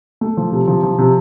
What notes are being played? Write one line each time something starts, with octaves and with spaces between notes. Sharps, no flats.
A3
F3
C3
F3
F3
C3